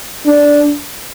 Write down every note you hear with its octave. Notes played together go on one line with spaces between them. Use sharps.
D4